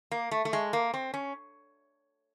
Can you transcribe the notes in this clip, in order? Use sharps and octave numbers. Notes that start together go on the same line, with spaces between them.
A#3
A3
A3
G#3
A#3
C4
C#4